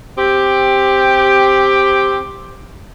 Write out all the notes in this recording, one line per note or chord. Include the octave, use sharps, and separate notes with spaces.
C4 G4